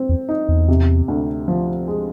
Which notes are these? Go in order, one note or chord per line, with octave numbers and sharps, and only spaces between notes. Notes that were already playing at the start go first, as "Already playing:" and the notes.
Already playing: C4
E2
D#4
E2
C3
D2
F3
G#3